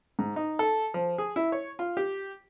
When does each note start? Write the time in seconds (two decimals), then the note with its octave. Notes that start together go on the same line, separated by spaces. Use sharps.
0.19 G#2
0.36 D#4
0.59 A4
0.94 F3
1.18 G#4
1.36 E4
1.52 C#5
1.79 F4
1.97 G4